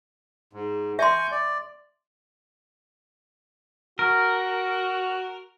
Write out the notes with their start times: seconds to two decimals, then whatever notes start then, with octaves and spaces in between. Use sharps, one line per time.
0.53 G#2
0.99 E5 G#5 C6 C#6 G6
1.31 D5
3.99 F#4 A#4